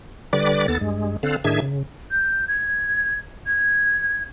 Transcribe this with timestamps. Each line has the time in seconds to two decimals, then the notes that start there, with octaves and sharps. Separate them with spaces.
0.33 D3 G3 B4 D5 D6
0.68 D#2 B3 A4 A6
0.81 G2 G#3
1.23 D3 C4 A4 F5 F#6
1.44 A2 D#3 D4 G#4 E5 G#6
1.62 C#3
2.11 G6
2.48 G#6
3.47 G#6